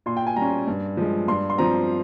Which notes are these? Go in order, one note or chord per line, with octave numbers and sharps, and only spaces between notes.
A#2 C6
G5
G#5
G3 C#4 A#5
G2
F3 G#3
G2 C6
C6
F3 C4 A#5